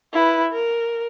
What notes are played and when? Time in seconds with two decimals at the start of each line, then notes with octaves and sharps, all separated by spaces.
0.13 E4 B4
0.51 A#4